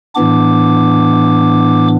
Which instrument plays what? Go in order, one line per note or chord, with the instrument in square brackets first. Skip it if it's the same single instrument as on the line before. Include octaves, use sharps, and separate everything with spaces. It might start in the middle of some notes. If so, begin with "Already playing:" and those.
[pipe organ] A2 E3 B3 D4 D6